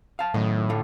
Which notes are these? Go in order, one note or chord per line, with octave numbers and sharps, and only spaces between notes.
F5 A5
F#2 A2 D#3 D#4
D3 A3 F4